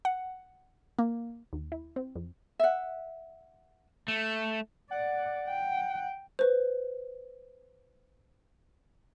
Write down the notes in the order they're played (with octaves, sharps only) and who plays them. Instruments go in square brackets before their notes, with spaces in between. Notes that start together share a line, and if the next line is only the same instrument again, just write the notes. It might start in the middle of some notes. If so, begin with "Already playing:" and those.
[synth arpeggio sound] F#5
A#3
D#2
E4
C4
F2
[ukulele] E5 F#5
[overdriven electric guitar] A3
[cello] D5 [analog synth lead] F#5
[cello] G5
[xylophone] B4 C5